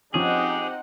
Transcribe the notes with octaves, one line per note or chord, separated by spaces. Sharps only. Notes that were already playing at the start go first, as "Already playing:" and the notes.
F3 C4 C#4 D#4 G4 G#4 F#5